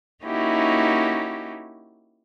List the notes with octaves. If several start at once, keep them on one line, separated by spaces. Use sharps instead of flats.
A#3 C#4 D#4 E4 F#4 G4